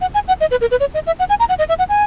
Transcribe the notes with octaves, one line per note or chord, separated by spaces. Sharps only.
F#5
G#5
F#5
D#5
B4
A#4
B4
C#5
D#5
E5
F#5
G#5
A#5
F#5
D#5
E5
F#5
G#5